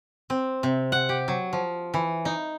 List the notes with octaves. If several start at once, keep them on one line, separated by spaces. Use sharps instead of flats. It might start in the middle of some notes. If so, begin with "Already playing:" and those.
C4
C3
F#5
G4
F#3
F3
E3
D#4